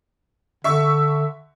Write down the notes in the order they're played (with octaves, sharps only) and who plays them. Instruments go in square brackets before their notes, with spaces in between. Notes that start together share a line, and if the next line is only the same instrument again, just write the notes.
[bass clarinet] D3 [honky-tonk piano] E5 C#6 E6